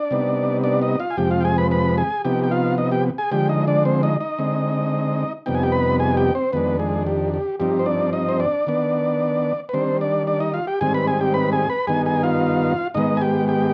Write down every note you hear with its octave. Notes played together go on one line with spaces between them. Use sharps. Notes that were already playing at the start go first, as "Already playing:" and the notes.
Already playing: D4 D5
C3 G3 B3 D#4
D4 D5
D#4 D#5
F4 F5
G#5
F2 C3 F3 G#3 G4 G5
F4 F5
G5
G#4 G#5
B4 B5
B4 B5
G#4 G#5
C3 F3 B3 D#4 G4 G5
G5
F4 F5
D#4 D#5
G4 G5
G#4 G#5
D3 F3 G#3 G4 G5
D#4 D#5
D4 D5
C4 C5
D#4 D#5
D#4 D#5
D3 G#3 C4
F2 C3 G3 B3 D#4 G5
G#5
G4 G5
B4 B5
G#4 G#5
G4 G5
C4 C5
F2 D#3 G#3 B3 D4 B4
G#3 G#4
G4
G4
G2 F3 C4 D#4 G4
C5
D4 D5
D#4 D#5
C5
D4 D5
D#3 B3 D4
B4
D#3 G3 C4 D4 C5
D4 D5
D4 D5
D#4 D#5
F4 F5
G4 G5
G#2 D#3 G3 C4 G#4 G#5
B4 B5
G#4 G#5
G4 G5
B4 B5
G#4 G#5
B4 B5
G2 D#3 B3 D#4 G#4 G#5
G#4 G#5
F4 F5
G#2 D#3 G#3 B3 D#4 D#5
G#5
G4 G5
G4 G5